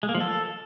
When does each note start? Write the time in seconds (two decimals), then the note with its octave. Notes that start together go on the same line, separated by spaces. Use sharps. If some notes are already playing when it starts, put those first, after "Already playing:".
0.03 G#3
0.09 A#3
0.15 F3
0.20 A4